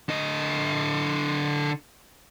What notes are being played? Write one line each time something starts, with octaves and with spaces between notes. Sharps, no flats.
D3 D#5